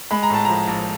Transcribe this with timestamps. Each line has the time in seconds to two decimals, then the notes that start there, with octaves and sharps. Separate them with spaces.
0.11 G#3 B5
0.23 A#5
0.30 A2 A5
0.45 F3 A#5
0.68 A#1